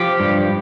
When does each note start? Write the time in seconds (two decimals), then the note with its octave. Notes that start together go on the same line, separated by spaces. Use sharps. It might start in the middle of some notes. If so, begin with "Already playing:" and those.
Already playing: F3 G4
0.20 G2